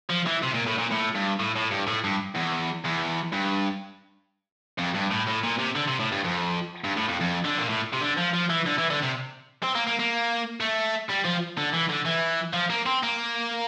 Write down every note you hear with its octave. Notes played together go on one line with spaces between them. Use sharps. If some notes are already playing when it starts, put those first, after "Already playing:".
F3
E3
C3
A#2
A2
A#2
A2
G2
A2
A2
G2
A2
G2
E2
E2
G2
F2
G2
A2
A2
A#2
C3
D3
C3
A2
G2
F2
G2
A2
F2
F2
D3
A#2
A2
C3
D3
F3
F3
E3
D3
E3
D3
C3
C4
A#3
A#3
A#3
A3
G3
F3
D3
E3
D3
E3
F3
A#3
C4
A#3